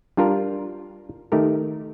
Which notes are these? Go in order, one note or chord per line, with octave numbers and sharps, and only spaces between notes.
G3 D4 F4 A#4
D#3 A3 D#4 G4 A#4